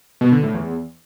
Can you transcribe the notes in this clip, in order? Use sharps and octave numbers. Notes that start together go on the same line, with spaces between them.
B2
D3
A2
E2